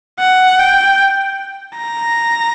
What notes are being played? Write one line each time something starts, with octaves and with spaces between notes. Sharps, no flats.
F#5
G5
A#5